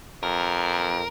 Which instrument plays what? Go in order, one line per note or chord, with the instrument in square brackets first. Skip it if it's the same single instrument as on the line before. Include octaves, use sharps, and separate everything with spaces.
[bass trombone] F2 [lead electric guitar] A#4